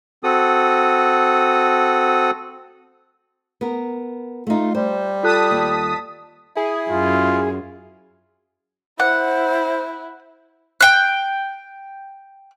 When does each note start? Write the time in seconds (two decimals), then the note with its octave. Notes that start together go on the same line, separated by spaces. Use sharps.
0.24 C4 F#4 A4 D#6
3.61 B3 A#4
4.47 A3 D#4 F4
4.75 G3 C5
5.23 F4 A4 A5 D#6 F#6 B6
5.51 D#2
6.57 E4 G#4
6.90 F#2 F4
9.00 E4 C5 F#5
10.80 G5 F#6